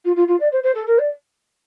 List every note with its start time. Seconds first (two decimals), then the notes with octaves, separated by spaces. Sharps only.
0.04 F4
0.16 F4
0.27 F4
0.39 D5
0.52 C5
0.63 C5
0.74 A4
0.87 A#4
0.98 D5